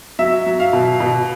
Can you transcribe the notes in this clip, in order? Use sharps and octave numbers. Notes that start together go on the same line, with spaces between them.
F#3 E5
F#3
F5
B2
B2